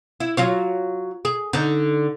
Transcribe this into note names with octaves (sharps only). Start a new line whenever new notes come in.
E4
F#3 F4 C#5
G#4
D3 D#4